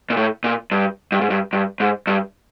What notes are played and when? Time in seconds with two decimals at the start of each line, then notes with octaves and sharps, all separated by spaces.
0.10 A#2
0.17 A2
0.44 A#2
0.71 G2
1.12 G2
1.21 G#2
1.30 G2
1.53 G2
1.80 G#2
2.07 G2